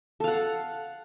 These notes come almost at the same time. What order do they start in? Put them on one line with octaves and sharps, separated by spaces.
A4 F5 F#5